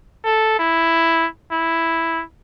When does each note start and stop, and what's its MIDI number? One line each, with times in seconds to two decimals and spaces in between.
0.25 0.59 69
0.59 1.27 64
1.52 2.23 64